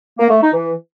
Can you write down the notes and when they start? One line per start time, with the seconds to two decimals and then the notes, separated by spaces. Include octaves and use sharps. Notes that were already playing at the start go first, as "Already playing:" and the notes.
0.19 A#3
0.30 A3
0.41 D#4
0.52 E3